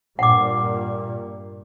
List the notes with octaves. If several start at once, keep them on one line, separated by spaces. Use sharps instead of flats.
G2 A#2 F#5 D6